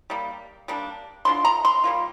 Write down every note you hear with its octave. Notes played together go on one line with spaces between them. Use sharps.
G3 A#3
G3 A#3 D4
D3 G3 D4 F4 C6
A#5
C6
G3 A#3 F4